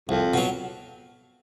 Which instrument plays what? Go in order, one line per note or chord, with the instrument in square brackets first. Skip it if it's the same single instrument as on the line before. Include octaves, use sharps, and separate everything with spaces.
[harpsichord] C2 [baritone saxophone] F2
[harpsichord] B2 F#3